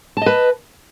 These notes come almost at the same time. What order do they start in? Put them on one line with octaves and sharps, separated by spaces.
A5 D#5 B4